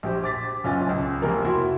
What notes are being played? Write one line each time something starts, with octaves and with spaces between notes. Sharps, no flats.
A#1 G4 C5
D6 A6 B6
F#1 B1 C#4 F4 G#5 A6
C#2
F1 F3 A#3 A#4
E4 F#4 E5 C6